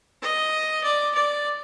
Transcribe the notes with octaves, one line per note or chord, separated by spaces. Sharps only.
D#5
D5
D5